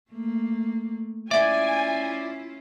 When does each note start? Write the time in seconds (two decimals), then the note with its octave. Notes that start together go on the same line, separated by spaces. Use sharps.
0.11 A3 A#3
1.31 C#4 E4 F4 D5 E5 G#5